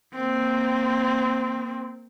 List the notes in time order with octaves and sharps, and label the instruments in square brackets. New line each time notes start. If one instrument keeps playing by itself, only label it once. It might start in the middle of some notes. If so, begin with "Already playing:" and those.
[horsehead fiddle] A#3 C4